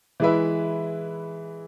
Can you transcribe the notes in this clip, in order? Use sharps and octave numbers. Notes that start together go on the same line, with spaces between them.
E3 G#3 E4 B4 E5